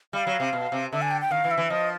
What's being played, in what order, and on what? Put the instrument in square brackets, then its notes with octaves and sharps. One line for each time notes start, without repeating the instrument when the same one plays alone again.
[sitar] G3 [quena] F5
[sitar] F#3
C3
B2
C3
[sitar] D3 [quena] E5
[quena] G#5
G5
G5
[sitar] D#3 [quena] F5
[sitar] E3
[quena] E5
[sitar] E3
[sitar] F3 [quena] D#5